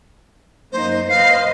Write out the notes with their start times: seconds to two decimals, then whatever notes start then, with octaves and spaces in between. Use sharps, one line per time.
0.72 F#2 A#3 D#4 C5
1.09 B4 C5 D#5 F5 C7